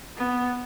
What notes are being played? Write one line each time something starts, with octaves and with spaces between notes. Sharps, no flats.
B3